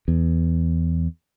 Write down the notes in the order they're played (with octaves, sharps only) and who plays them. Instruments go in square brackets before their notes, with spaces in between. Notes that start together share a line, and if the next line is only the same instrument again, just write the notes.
[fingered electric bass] E2